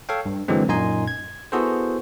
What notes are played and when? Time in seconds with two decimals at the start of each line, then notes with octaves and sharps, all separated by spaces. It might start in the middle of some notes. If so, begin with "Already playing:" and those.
0.09 A4 C#5 F5 G5
0.26 G2
0.48 D3 E3 F#3 G#3 C4
0.68 F#2 A#2 D#4 D#5 G#5 C6
1.08 G#6
1.52 B3 E4 F#4 G#4 A4 C5